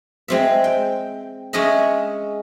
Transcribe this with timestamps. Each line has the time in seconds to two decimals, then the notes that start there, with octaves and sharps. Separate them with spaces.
0.28 G#3 C4 E5
0.64 G5
1.53 G#3 C#4 D#5 E5